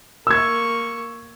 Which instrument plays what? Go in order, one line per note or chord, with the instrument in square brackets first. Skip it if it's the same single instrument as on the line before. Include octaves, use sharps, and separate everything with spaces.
[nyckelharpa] A#3 C#6 [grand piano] E6 G#6